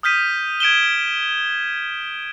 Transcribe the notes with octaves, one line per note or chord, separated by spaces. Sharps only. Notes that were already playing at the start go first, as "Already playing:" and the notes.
D#6 F6 G6 B6 D#7
G#6 D7 E7 G7